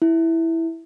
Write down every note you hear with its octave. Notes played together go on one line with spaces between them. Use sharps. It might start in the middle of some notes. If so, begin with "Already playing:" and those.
E4